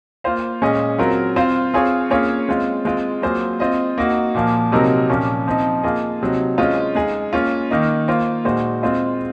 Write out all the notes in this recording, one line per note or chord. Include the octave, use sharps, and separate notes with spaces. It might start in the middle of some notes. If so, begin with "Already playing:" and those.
A#3 F4 C5 F5
A#2 G#3 C#4 G#4 D#5
F#3 C4 F4 A#4
C4 F4 C5 F5
C4 F4 G#4 C#5 F5
A#3 C#4 F4 G#4 C#5
G#3 C4 F4
G#3 C4 F4
F#3 A#3 F4 G#4 C5
C4 F4 C5 D#5
A#3 D#4 F#4
A#2 F3 A#3
C3 F#3 C4 D#4 A#4
A#2 F3 A#3 C#4
F3 C4 D#4
A#3 F4 G#4 D#5
C3 F#3 C4 D#4
G#3 C#4 F4 C5 D#5
G#3 D#4 G#4
A#3 C#4 F4
D#3 A#3 D#4
A#3 F4 C5 F5
A#2 G#3 D#4 F#4 C5
G#3 C4 F4 C5 D#5